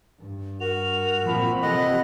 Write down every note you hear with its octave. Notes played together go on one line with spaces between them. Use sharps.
G2
F#4 A#4 F7
A#2 F3 C4 B5
C3 F3 A4 D#5 F#5